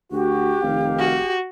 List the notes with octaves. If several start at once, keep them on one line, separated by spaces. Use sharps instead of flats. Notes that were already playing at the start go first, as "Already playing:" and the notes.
D2 F#4 G4
F1 D#3 F5
F#4